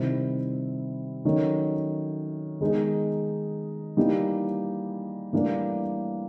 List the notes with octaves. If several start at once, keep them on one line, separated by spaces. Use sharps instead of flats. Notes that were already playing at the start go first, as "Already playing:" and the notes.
Already playing: C3 D#3 G3 C4 E4
D#3 F#3 A3 C#4
D#3 G#3 B3 D#4
E3 G3 A#3 D#4 G4
A2 E3 G3 A#3 D4